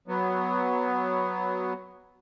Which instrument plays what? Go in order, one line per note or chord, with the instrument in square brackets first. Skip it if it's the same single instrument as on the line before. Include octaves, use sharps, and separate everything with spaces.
[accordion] F#3 B3